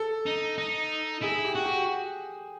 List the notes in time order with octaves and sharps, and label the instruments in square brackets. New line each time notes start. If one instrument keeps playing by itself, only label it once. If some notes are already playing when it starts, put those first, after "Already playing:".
Already playing: [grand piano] A4
[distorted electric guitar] D#4
D#4
[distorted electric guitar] E4 [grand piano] G#4
[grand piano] G4
[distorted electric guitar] F#4
[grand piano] G4